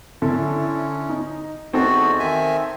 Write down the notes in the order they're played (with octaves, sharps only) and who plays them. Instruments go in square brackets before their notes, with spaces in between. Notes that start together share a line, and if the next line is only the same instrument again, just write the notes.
[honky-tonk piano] D3 E4 A4 [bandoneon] C#4
[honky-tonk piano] D#4
[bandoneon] E2 F#4 [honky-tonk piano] C4 D#4 A4
[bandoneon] D#3 E5 G#5